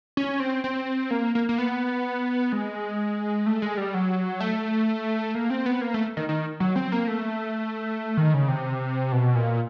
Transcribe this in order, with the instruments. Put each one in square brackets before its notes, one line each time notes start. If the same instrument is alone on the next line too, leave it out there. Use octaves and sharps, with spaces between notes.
[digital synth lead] C#4
C4
C4
A#3
A#3
A#3
B3
G#3
A3
G#3
G3
F#3
A3
A#3
C4
B3
A#3
A3
D#3
D#3
F#3
C4
A#3
A3
D#3
C#3
C3
B2
A#2